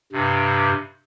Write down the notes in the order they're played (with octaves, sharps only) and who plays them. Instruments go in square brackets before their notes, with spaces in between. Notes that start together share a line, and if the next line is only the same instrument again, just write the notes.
[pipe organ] G2 C3